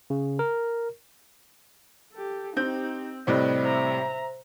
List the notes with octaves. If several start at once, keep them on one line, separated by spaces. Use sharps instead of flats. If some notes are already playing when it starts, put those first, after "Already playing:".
C#3
A#4
G4 A4
C4 D#4 G4 G6
A2 C3 G3 C5 D#5 F#6
C5 E5 A#5